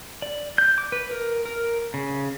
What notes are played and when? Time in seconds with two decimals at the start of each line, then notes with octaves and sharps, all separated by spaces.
0.22 D5
0.58 G6
0.78 D6
0.92 B4
1.11 A#4
1.45 A#4
1.94 C#3